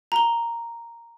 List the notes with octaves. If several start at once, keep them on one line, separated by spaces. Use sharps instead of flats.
A#5 G7